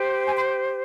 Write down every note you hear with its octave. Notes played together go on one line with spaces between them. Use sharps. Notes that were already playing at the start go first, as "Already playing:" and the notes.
Already playing: G4 C5
G#5
C6